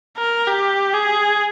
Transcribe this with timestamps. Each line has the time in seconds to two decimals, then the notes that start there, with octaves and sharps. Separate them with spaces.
0.18 A#4
0.48 G4
0.94 G#4